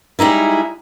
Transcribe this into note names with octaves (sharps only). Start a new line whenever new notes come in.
G3 G#3 D#4 E4